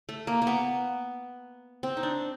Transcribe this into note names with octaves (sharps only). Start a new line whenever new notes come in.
A3
A#3
A#3
B3
C4
D#4
D4